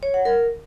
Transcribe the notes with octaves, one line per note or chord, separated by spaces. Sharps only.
C#5
F#5
A#4